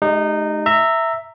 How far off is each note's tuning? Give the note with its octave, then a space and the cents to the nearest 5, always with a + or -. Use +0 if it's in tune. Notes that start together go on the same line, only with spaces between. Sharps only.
G#3 +45 D#4 -20 G4 +0
E5 +0 A#5 -20